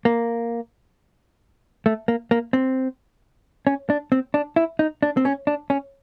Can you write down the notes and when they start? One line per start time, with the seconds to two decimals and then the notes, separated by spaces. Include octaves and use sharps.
0.05 A#3
1.86 A3
2.08 A#3
2.31 A#3
2.53 C4
3.67 C#4
3.90 D4
4.12 C4
4.34 D4
4.56 E4
4.79 D#4
5.03 D4
5.17 C4
5.25 C#4
5.47 D4
5.70 C#4